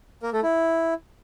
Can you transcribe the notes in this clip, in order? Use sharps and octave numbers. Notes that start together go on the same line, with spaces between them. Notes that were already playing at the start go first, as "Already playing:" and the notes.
A#3 A#4
A3 A4
E4